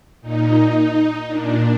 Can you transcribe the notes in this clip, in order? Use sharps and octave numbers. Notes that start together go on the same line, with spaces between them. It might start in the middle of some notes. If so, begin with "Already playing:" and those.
A#2 D#4
A#2 D4